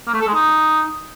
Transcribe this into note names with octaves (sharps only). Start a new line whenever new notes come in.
A#3
A3
A4
G#3
D#4